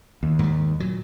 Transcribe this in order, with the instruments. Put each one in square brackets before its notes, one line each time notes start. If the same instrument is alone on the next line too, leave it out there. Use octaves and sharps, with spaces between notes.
[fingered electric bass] D#2
[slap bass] G#2 G3
A#2 F#3